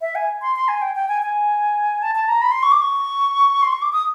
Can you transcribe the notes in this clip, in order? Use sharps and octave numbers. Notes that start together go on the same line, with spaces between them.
E5
G#5
C6
C6
G#5
G5
G5
G#5
G#5
A5
A5
A#5
B5
C6
C#6
D6
C#6
C6
C#6
D6
D#6